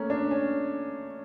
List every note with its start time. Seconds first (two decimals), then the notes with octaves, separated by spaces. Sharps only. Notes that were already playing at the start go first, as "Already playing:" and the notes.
Already playing: A3 A#3 C#4
0.10 D4
0.31 C#4